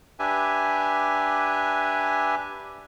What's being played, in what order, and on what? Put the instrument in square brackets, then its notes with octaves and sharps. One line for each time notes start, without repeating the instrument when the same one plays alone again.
[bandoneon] D4 G4 B4 E5 G#5